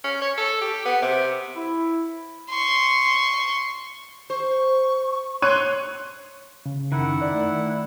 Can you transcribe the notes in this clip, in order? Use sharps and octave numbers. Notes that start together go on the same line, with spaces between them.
C#4
C#5
A4
G4
B3
C3
E4
C6 C#6
C5 C#6
C#5 C6 F#6 D#7
C#3
F#2 D#3 E4 F#5
F#2 D5
A3